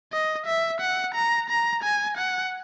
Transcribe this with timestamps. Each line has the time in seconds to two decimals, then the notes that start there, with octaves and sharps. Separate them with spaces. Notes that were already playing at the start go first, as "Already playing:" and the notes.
0.12 D#5
0.46 E5
0.81 F#5
1.15 A#5
1.49 A#5
1.83 G#5
2.17 F#5